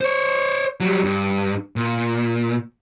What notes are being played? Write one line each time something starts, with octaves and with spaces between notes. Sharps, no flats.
C5 C#5
F#3 G3
G2
A#2